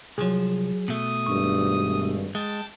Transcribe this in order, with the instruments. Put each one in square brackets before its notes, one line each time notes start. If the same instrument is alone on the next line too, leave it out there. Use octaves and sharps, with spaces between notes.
[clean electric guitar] C2 F3 [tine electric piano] F#3 G#4
[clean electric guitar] B2 A3 [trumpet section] D#6
[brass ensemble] G#1 G2 [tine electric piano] C#6
[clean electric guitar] G#3 [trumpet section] G5 A5